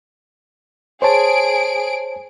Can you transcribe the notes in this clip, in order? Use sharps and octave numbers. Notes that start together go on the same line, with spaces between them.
G#4 C5 C#5 A5 D7